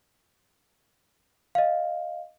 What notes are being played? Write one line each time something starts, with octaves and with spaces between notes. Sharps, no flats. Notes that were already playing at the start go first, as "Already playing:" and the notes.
D#5 F5